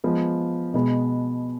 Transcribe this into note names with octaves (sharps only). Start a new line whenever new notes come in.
F3 G#3 B3
B2 G#3 B3